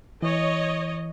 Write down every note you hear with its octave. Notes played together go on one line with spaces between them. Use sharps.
E3 C#5 D#5